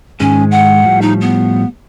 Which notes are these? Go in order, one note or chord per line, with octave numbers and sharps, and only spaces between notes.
G#2 D#3 G#3 C#4
F#5
A2 F3 G3
D#4
B3